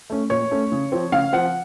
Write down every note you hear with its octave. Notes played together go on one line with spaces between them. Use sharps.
A3 C#4
A#2 C#5
A3 C#4
C#3
F3 C4
C#3 F5
F3 C4 F#5